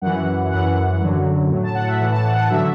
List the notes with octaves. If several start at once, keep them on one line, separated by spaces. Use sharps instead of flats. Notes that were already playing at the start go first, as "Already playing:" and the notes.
F#2 E3 F#5
F#2 E3 F#5
F#2 D3 F#3
A2 F#3
A5
F#5
E5
A2 E3 F#5
A5
F#5
F#5
D3 F#3 E5